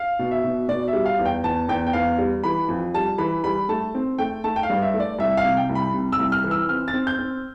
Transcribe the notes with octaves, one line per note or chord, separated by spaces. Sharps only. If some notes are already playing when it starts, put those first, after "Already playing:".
Already playing: F5
B2
E5
B2
B2 D5
E5
G3
F5
E2
G5
E2 A5
E2 G5
G5
E2 F5
G3
E3 B5
F2
G3 A5
E3 B5
G3 B5
A3 A5
C4
A3 G5
A3 A5
G5
F5
G2
E5
A3
D5
C2 E5
F5
C3
G5
C2
B5
C3
E6
C2
F6
E3
E6
C4 F6
A6
C4
G6
C4